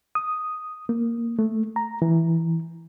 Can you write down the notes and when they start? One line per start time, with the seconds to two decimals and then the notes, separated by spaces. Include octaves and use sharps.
0.15 D#6
0.89 A#3
1.39 A3
1.76 A#5
2.02 E3